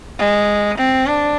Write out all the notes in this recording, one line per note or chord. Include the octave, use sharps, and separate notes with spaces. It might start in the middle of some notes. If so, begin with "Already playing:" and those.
G#3
C4
D4